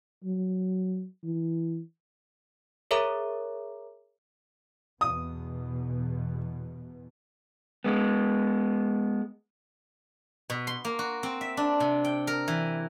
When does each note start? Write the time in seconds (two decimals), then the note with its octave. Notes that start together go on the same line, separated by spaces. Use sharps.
0.24 F#3
1.24 E3
2.91 G#4 A#4 C#5 E5 A#5 D6
5.01 E2 B2 D#6
7.84 G#3 B3
10.50 B2
10.67 C6
10.85 A#3
10.99 F#4
11.23 C4
11.41 E5
11.57 D4
11.80 C3
12.05 G5
12.27 A#4
12.48 E3